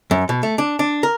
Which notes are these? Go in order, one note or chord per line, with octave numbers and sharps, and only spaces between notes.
F#2
B2
A3
D4
D4
A#4